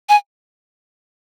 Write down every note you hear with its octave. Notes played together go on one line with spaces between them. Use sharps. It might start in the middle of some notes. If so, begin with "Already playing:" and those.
G#5